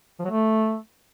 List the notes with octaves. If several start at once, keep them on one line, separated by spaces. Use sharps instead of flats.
F3
F#3
A3